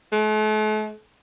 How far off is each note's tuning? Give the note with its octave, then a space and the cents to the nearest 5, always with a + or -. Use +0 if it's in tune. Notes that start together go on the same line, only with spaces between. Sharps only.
A3 -45